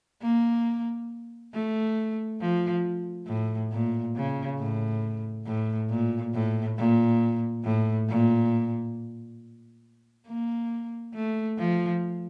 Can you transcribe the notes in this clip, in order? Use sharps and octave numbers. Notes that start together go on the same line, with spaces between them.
A#3
A3
F3
A2
A#2
C#3
A2
A2
A#2
A2
A#2
A2
A#2
A#3
A3
F3